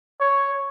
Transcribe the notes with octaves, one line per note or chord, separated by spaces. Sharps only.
C#5